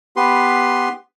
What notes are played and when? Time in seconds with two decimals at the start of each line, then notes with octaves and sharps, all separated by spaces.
0.16 B3 G4 B4 C6